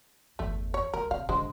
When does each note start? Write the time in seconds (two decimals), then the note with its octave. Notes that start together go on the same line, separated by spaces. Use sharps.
0.39 G1 E2 A3
0.74 C#5
0.93 C#2 A#4
1.11 C3 F5
1.29 G#1 D3 G#3 C5